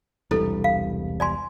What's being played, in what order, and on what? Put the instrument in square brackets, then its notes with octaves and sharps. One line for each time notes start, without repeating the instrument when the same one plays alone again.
[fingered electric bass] E1 C2 G3 [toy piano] E4 A4
[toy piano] F5
D5 G#5 C6